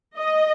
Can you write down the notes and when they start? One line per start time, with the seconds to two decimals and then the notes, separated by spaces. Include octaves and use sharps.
0.16 D#5